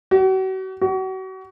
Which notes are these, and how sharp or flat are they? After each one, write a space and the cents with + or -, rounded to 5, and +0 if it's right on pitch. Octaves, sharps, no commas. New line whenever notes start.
F#4 +40
F#4 +35